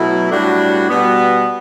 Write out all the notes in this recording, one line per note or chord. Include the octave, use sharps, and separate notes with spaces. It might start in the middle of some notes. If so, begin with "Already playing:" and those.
Already playing: B2 F#3 A3 E4
A2 G3 D4 F#4
B2 G3 B3